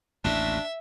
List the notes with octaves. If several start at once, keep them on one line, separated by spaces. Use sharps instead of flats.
A1 D#2 A2 D4 E5